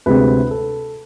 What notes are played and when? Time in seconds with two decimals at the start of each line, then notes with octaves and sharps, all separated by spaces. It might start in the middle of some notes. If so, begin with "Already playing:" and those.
0.06 D2 C3 G#3 C4 B4
0.51 A4